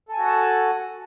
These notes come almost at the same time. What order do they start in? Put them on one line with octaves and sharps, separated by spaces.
A4 G#5 F#4 F#5 A5